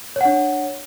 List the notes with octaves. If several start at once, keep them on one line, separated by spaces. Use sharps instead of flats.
D4 C#5 F#5